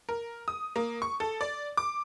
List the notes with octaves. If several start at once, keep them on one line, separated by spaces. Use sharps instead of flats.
A#4
D#6
A#3
C#6
A4
D5
D6